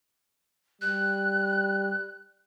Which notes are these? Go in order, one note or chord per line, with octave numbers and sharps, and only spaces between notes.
G3 F#6